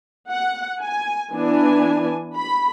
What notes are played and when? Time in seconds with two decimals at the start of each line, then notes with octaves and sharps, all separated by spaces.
0.29 F#5
0.82 G#5
1.33 E3 B3 D4 G#5
2.37 B5